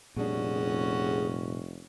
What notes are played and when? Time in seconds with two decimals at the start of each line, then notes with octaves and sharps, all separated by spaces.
0.16 F1 A#2 G3 C#4 D4 F#4 G#4